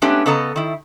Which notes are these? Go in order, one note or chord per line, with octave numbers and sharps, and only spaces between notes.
G#3 A3 B3 C#4 D4 G4
C#3 B3 A4 D#5 A#5
D#3 E4